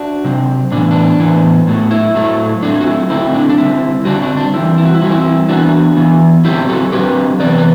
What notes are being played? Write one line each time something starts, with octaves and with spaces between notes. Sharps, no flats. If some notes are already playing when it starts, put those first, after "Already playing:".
Already playing: D4 F#4
C3 F#3 C4
A2 E3 B3 D4
D4
A2 E3 B3
A2 F#3 A3
E4
A2 F#3 A3
D3 F#3 A3 C4 D4
F#4
E4
D3 F#3 A3 C4 E4
D4
D4
D3 G3 C4 E4
D3 G3 C4 D4 F#4
D4 F#4
D4
E3 G3 C4 E4
E4
F#4
E4
E3 G3 C4 F#4
E4
E3 B3 D4 F#4
E3 B3
D3 F#3 C4 E4 G4
F#4 A4
D3 F#3 C4 G4 B4
C3 E3 B3 B4 D5
B4